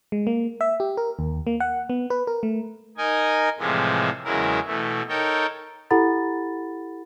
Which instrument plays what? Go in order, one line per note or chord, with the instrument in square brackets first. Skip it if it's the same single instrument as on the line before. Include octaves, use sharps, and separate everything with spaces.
[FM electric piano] G#3
A#3
E5
G4
A#4
D#2
A#3
F#5
B3
B4
A#4
A3
[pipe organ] D#4 A#4 D#5 G#5
A2 C3 E3 F3 G#3
E2 C#3 F#3 G#3 E4 A#4
B2 E3 A3
D#4 A4 A#4 C#5 G5
[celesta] E4 G4 A4 F#5 B5 A6